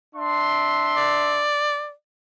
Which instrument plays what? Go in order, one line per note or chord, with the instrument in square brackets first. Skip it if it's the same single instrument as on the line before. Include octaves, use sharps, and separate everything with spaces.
[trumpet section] D4 E5 C6
[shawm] D5